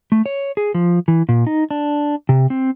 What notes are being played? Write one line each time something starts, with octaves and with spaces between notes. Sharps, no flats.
A3
C#5
G#4
F3
E3
A#2
D#4
D4
C3
C4